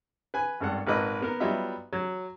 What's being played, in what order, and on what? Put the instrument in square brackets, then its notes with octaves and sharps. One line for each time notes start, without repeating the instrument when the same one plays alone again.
[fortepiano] B4 G#5
G#1 G2 A4 F#5
G#1 A#2 B4 D#5 D#6
A#3 B3 A#4
F#3 G3 B3 F4 D#5 E5
F#3